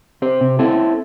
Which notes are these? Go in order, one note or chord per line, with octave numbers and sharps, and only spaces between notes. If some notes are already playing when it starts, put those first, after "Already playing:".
C4 G4 C5
C3
C4 E4 A4
C4